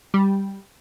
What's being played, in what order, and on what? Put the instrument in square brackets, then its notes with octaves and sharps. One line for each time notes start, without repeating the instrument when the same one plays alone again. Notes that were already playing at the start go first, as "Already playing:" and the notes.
[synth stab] G3